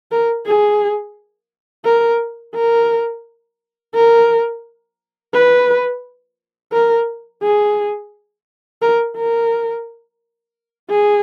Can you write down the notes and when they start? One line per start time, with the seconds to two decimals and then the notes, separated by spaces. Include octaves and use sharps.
0.12 A#4
0.47 G#4
1.85 A#4
2.56 A#4
3.95 A#4
5.34 B4
6.73 A#4
7.43 G#4
8.82 A#4
9.17 A#4
10.90 G#4